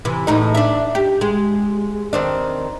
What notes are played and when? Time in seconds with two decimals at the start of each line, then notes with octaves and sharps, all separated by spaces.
0.05 C3 E3
0.27 E2 A2 D#4
0.55 D4 E5
0.95 G4
1.21 G#3
2.13 D#3 C4 D4